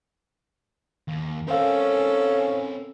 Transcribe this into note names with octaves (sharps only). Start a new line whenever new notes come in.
D#2
C4 C#4 A4 A#4 C5 F5